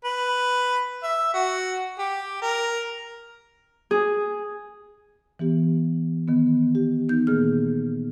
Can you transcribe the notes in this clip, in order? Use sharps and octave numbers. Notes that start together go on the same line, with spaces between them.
B4
E5
F#4
G4
A#4
G#4
E3 B3 G4
D#3 B3
G4
B3 D#4 G6
A#2 D#3 A#3 G#4 F6